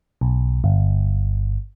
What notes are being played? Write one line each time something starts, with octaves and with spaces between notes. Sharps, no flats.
B1
G1